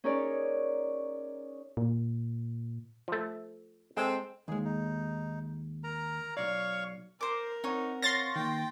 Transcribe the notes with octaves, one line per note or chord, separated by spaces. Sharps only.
C#4 D#4 G#4 A#4 C#5 D5
A#2
F3 A3
G#3 C4 A4
D#2 G#3 G#4
D#4
A#4 A#5
B1 C#5 D5 F5 C#6
A#4 C5 D6
C4 D#4 C#5 F#5
C#5 F5 C6 A6 A#6
D#3 A#3 G5